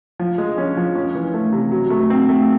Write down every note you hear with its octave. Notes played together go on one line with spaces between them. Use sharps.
F3
G#3
C#4
F3
C#4
E3
A3
C3
F#3
A3
C4
A3